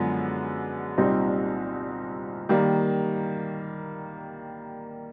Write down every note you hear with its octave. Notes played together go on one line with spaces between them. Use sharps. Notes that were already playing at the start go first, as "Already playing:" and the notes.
Already playing: F#2 D3 F3 G#3 B3
C2 A#2 G3 C4 D#4
D#3 G3 A#3